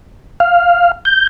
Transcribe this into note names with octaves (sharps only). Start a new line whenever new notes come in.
F5
G6